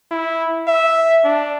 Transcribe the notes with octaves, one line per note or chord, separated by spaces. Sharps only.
E4
E5
D4